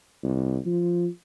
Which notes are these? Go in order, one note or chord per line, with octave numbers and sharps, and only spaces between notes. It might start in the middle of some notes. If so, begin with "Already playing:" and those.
C2
F3